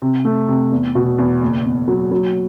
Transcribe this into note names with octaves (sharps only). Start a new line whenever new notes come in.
C3
A3
C3
E2
B2
E2
F#1
E2
F#3
F#3